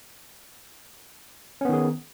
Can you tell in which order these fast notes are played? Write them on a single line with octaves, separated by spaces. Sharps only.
C#4 B3 D#3 G#4